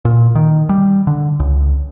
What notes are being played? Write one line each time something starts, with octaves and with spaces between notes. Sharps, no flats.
A#2
D#3
G3
D3
C#2